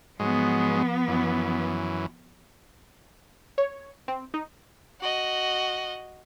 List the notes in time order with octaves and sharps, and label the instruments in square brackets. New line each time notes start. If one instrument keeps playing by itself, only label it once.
[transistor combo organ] G#2 F#3 G#3 [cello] F3 B3
[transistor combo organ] F#2 E3
[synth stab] C#5
C4
D#4
[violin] F#4 D#5